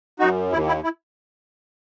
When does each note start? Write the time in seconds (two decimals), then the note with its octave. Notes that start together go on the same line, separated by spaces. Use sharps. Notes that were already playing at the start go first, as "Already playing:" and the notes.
0.19 F#2 D#4 F#4
0.52 D#2 E4
0.68 E4
0.84 E4